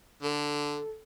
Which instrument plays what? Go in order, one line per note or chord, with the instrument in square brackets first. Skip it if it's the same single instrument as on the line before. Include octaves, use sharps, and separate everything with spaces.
[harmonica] D3 [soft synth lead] A4